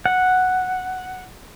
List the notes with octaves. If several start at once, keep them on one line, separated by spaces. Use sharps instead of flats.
F#5